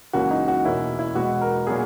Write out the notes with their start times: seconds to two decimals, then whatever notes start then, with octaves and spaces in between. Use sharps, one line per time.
0.13 C#2 C#3 E3 A#3 C#4 F#4
0.31 D#4
0.48 F#4
0.64 E2 B2 A#3 C#4 E4
0.99 E4
1.15 E2 B2 G#3 B3 F#4
1.41 A#4
1.67 A#2 F#3 B3 G#4